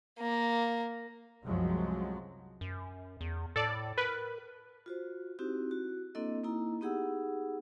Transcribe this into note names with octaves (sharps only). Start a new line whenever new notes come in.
A#3
C2 F#2 F3 F#3 G#3
F#2
E2
A2 A4 D5
A#4 B4
F4 F#4 C5
C4 D#4 E4 F#4 G4
F#4
A#3 C4 D4 E4 A4 D#5
A#3 D#4 E4 A#5
B3 D#4 G4 G#4 F#5 E6